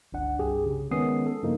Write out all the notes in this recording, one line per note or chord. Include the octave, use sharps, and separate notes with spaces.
G1 C#2 D4 F#5
C2 G2 G4 G#4
C#3
D#3 G#3 B3 C#4 D#6 C7
A4
G2 C#3 F3 A#3 D#4